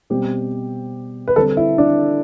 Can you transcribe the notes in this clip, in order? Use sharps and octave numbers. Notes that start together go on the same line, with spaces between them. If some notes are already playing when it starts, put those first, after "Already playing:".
B2 G3 C4 G4
B4
D3 G3 C4 A4
E4
D4